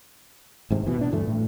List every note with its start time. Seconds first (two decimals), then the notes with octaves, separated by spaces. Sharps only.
0.71 G#1 G#2 C3
0.86 B2 E3
0.99 B2 D4
1.11 D2 G2 E3 A3
1.27 A2